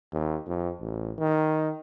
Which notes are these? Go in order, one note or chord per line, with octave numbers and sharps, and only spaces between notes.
D#2
F2
A1
D#3